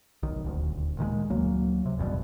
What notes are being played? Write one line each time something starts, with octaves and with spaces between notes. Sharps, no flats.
B1 D#3
D#1 D2
A#2 D#3 E3 G#3
D2 F#3 A#3
C3
G#1 E2 G2 B2